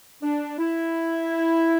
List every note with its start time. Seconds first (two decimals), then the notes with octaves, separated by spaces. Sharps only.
0.23 D4
0.58 E4